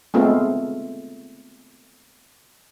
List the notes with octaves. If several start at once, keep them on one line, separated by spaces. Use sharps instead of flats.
G#3 A3 B3 C4 F4